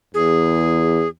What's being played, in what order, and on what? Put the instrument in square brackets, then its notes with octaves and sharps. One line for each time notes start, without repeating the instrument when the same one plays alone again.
[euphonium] E2 [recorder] G#4